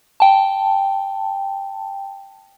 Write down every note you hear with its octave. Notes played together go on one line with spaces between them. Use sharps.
G5 A5